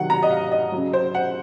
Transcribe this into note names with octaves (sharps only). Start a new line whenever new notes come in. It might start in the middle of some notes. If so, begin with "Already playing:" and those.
Already playing: C3 D#3 F#3 F#5
A#5
D#5
F5
D#5
C#3 F#3
C5
F#5